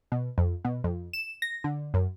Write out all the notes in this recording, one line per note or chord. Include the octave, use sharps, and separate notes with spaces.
B2
F2
B2
F2
E7
A#6
D3
F#2